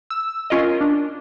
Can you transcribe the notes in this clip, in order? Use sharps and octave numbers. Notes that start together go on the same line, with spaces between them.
E6
C#4 F4 A#4 D#5
D4